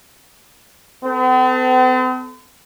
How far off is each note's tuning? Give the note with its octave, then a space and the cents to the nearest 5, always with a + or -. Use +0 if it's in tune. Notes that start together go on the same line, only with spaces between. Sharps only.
C4 -45 A4 +0